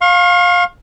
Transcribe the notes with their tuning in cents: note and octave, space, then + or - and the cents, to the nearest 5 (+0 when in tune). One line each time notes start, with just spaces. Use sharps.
F5 +20 C#6 -40